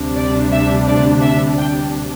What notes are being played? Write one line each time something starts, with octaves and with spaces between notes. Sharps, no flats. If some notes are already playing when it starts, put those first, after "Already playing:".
Already playing: D2 C3 G3 D4
D5
E5
D5
E5
G5